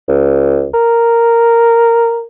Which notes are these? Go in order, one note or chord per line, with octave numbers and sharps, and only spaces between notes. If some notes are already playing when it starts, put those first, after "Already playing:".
C#2
A#4